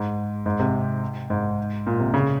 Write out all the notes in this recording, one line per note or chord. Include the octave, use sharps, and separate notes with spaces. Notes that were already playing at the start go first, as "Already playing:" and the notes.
Already playing: G#2
G#2
C3
G#2
A#2
C3
C#3